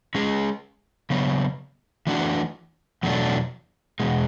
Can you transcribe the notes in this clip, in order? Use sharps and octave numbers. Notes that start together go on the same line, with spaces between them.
G#3 C#4 G#4
C#3 F#3 B3
E3 A3 D4 F#4
E2 B2 F#3 A3 D4
E2 B2 G#3